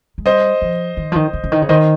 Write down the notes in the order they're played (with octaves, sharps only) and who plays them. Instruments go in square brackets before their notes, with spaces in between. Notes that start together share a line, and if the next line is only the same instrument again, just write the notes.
[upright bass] G#3
[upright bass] G3 [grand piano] C5 D#5
[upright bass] F3
D#3
F3
D#3
C#3
C#3
D#3
C#3
[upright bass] D#3 [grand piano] C5 D#5